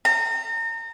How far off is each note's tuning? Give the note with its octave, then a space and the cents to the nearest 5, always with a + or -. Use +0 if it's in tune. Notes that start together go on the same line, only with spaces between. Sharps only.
A#5 -35